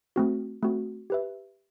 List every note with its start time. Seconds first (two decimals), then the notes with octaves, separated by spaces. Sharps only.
0.16 A3 C4 F#4
0.63 A3 C4 F#4
1.10 G4 B4 E5